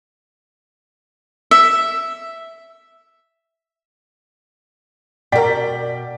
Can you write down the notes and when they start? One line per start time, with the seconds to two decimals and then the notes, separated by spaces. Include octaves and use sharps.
1.51 E5
5.32 B2 A#4 D5 G5 B6